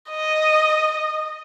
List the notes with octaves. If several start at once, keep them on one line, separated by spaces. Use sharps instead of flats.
D#5